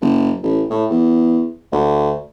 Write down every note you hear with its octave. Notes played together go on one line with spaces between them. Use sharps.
F#1
A1
A2
E2
D2